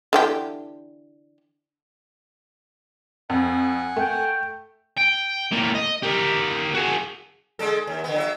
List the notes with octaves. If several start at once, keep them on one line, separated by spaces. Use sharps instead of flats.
D3 E3 G4
F2 F#5 G#5
A3 G5
G5
A2 A#3
D#5
G4 A#4
F#4 G#4
D3 G#3 A4
D#2
D3 B3
F#3 F#4 E5